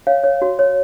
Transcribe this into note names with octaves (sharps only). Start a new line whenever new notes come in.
C#5 F5
C#5
F#4
C#5